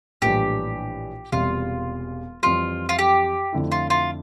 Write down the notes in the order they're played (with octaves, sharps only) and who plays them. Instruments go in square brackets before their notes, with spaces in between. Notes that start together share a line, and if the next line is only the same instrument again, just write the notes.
[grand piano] A#1 A2 E3 G3 D4 [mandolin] G4
[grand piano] E1 E2 C3 G3 [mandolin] F4
[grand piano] F2 E3 G3 [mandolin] F4
[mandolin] F4
G4
[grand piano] F2 D3 A3 E4
[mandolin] F4
F4